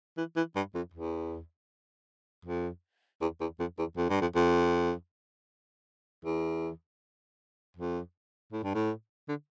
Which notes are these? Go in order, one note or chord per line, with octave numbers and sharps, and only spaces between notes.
E3
E3
G2
F2
E2
F2
E2
E2
F2
E2
F2
G2
F2
F2
E2
F2
A2
G2
A2
D3